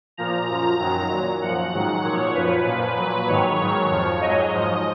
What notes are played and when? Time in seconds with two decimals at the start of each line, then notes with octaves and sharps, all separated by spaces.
0.17 A#2 F3 A#5
0.48 F#2 F3
0.79 F#2 D#3 F#3 A#5
1.11 A#2 F#3
1.42 F#2 F3 F#5
1.74 G#2 D#3 F#3
2.04 A#2 F3 C#5
2.35 F#2 F3 B4
2.67 A#2 F3
2.97 A#2 F#3 B4
3.28 G#2 D#3 F#3 C#5
3.59 G#2 D#3 F#3
3.90 F2 F3
4.21 G#2 F#3 D#5
4.53 G#2 F3